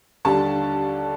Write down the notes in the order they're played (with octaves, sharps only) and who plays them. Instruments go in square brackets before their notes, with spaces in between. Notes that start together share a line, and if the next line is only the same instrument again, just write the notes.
[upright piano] D#2 D3 G3 D4 A4 A5